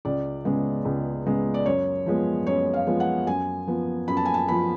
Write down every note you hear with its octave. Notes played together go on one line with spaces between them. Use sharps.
C#2 D5
C#3 G#3 B3
C#2
C#3 G#3 B3
D5
F#2 C#5
F3 G#3 B3
F#2 C#5
F5
F3 G#3 B3
F#5
F#2 G#5
F3 B3
F#2 B5
A5
G#5
A5
F3 B3 B5